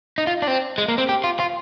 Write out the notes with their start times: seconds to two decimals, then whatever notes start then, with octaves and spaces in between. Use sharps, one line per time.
0.18 D#4
0.27 F4
0.42 D4
0.48 C4
0.78 G#3
0.88 A#3
0.98 C4
1.09 G4
1.24 F4
1.39 F4